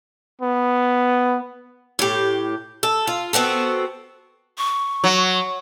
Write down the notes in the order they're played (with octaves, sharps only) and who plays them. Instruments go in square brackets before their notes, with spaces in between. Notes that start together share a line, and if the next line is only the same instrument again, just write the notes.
[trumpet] B3
[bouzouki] A2 G4
A4
F4
B3 C4 F#4 A4
[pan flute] C#6
[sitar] F#3